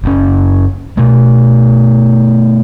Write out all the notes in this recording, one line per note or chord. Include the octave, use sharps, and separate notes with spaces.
F#1 B2 C#4
B2 A3